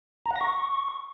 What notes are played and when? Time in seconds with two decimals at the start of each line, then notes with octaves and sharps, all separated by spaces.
0.26 A#5
0.31 F#5
0.36 A#6
0.41 C#6